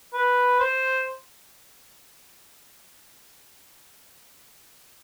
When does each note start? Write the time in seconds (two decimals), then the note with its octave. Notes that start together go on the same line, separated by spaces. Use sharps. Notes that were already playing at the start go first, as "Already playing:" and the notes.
0.14 B4
0.60 C5